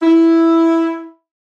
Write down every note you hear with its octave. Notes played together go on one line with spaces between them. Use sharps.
E4